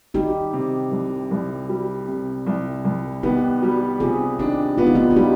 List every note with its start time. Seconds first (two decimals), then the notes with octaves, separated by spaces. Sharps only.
0.14 G3 D#4 G4
0.53 C3
0.91 C2
1.31 C2
1.69 G3
2.08 C3
2.46 C2
2.84 C2
3.23 B3 D#4 G4
3.62 G3
4.00 C3 F4 G#4
4.39 D4 D#4 G4
4.78 B3 F4
4.87 D#4
4.95 D4 F4
5.11 F4
5.16 G3 D#4 G4